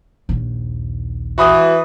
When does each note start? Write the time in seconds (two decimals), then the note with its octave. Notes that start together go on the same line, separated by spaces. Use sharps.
0.29 A#1 D#2
1.38 E3 F#4 B5 D#6